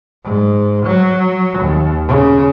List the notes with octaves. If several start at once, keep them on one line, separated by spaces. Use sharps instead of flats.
G#2
F#3
D#2
C#3